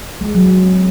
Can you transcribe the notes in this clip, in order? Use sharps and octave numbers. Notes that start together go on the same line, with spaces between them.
G#3
F#3
C4